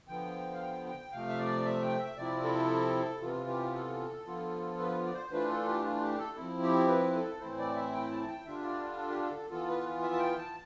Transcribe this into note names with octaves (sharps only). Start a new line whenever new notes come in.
D3 F3 B3 G5
F5
G5
G5
C3 F3 A3 F5
E5
D5
E5
G5
E5
C3 F3 C4 E4 D5
A4
C3 E3 B3 F4
G4
A4
D3 F3 B3 F4
B4
D5
C5
E3 A3 D4 F4 B4
A4
G4
F4
G4
A4
F3 C4 E4
G4
B4
A4
A2 E3 A3 C4 E4 C5
D5
E5
G5
A5
G5
D3 G3 D4 F4 E5
D5
A4
G4
A4
E3 B3 F4 A4
B4
E5
A5
G5
A5